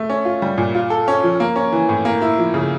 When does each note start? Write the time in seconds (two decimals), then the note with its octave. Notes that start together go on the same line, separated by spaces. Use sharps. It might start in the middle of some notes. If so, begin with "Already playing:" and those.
Already playing: A3
0.10 C#4
0.25 F4
0.42 G3
0.58 A#2
0.75 F4
0.90 A4
1.08 C#4
1.24 F3
1.40 A#3
1.56 C#4
1.72 E3
1.89 A2
2.05 A#3
2.22 E4
2.38 F3
2.54 C#3